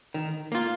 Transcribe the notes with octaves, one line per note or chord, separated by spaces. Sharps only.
D#3
A#3 F4